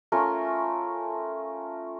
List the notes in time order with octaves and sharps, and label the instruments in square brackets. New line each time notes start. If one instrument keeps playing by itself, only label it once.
[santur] A3 C#4 F4 A#4